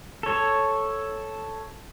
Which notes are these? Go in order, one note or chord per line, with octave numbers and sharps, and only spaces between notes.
A4 C#5